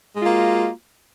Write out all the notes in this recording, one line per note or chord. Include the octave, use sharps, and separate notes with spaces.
G#3 A#3 F4 F#4